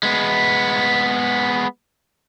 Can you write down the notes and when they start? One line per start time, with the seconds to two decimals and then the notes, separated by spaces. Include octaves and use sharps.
0.03 G#3 B3